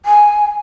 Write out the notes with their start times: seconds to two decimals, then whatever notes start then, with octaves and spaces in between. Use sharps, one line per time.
0.05 G#5